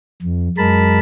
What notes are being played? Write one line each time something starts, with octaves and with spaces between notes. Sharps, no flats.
F2
F#2 G#3 A#4 A5 B5